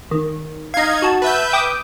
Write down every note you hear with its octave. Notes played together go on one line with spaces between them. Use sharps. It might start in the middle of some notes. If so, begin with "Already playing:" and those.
D#3
D#4 D#5 F5 G#6
F#4 A5
B4 E5 G6
G5 D6 D#6